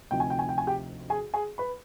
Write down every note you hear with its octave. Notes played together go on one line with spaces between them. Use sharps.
D2 C3 F3 C4 D#4 G5
G#5
G5
G#5
G5
G#5
G4 G5
G#4 G#5
G#4 G#5
B4 B5